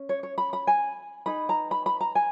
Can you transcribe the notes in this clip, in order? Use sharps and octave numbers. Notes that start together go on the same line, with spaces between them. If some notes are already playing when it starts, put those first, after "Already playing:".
Already playing: C#4
C#5
C#5
B5
B5
G#5
D#4 G#4 B4 B5
A#5
B5
B5
A#5
G#5